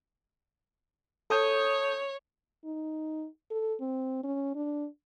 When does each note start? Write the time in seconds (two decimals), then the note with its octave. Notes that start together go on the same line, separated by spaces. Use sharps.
1.30 A4 C#5 D#6 G6
2.65 D#4
3.51 A4
3.80 C4
4.24 C#4
4.55 D4